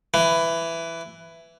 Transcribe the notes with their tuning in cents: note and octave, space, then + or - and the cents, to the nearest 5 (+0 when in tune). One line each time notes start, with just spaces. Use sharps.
E3 +10